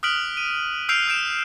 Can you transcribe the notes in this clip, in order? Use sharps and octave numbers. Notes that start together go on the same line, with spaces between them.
D#6 F6 F#6 B6 D7 F#7
D#7
E6 F6 G6 C7 D7 F7
E6 G6 D7 E7